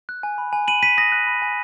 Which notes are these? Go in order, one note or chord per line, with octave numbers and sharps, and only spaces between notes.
F#6
G#5
B5
G#5
B5 D#7 F#7
G#5 B6 D#7
D#6 A#6
F#6
B5
G#5